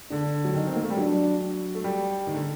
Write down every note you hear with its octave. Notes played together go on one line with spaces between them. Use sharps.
D3 D4
F#3
D#3 D#4
C4
A#3
A3
G3
F#3 D4
A3
G3
D#3
D3